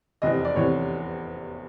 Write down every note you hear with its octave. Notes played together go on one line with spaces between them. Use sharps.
F1 E2 C3 D#5
D5
F1 E2 C3 C#5